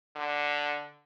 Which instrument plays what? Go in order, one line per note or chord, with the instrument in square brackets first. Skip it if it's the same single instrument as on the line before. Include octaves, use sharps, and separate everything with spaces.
[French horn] D3